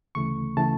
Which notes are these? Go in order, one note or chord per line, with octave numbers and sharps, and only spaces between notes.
D2 C#3 E3 A3 C#6
C#3 E3 A3 A5